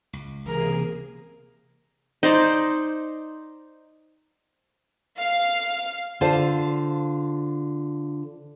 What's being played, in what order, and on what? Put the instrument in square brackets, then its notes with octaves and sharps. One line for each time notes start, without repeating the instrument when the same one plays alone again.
[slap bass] C#2
[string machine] C3 A#3 G#4 [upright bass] E3 C#4 [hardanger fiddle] A#4
[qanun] D#4 C5 D5
[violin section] F5
[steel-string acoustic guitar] D3 F4 C5 F5 A5